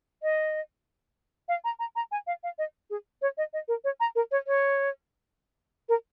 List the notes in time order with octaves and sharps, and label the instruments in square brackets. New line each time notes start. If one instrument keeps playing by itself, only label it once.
[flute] D#5
F5
A#5
A#5
A#5
G#5
F5
F5
D#5
G#4
C#5
D#5
D#5
A#4
C#5
A#5
A#4
C#5
C#5
A#4